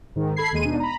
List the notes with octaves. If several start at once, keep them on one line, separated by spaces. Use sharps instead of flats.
G#2 D#3
A4 B5 G#6 C7
D#2 G#3 D#7
B2 D4 D#4
A#5 B5